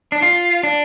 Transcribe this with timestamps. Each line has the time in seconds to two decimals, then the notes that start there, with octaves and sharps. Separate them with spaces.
0.12 D4
0.22 F4
0.63 D4